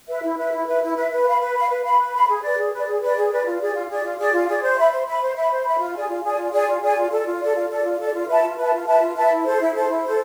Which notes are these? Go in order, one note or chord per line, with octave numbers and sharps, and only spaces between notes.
B4 E5
E4
B4 E5
E4
B4 E5
E4
B4 E5
B4
F5 B5
B4
F5 B5
B4
F5 B5
B4
F5 B5
G#4
B4 D5
G#4
B4 D5
G#4
B4 D5
G#4
B4 D5
F4
G#4 D5
F4
G#4 D5
F4
G#4 D5
F4
G#4 D5
C5
E5 B5
C5
E5 B5
C5
E5 B5
C5
E5 B5
F4
G#4 D5 G#5
F4
G#4 D5 G#5
F4
G#4 D5 G#5
F4
G#4 D5 G#5
F4
A4 D5
F4
A4 D5
F4
A4 D5
F4
A4 D5
F4
B4 E5 A5
F4
B4 E5 A5
F4
B4 E5 A5
F4
B4 E5 A5
E4
A4 C5
E4
A4 C5
E4
A4 C5